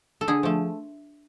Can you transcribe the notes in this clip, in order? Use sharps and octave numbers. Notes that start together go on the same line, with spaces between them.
A4
D3 G#4
F3 A3